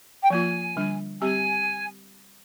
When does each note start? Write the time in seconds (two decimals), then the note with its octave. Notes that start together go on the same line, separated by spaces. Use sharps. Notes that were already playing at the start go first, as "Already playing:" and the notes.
0.23 G5
0.30 F3 A#3 F4 G#5
0.76 D3 G3 D4
1.21 G3 C4 G4 G#5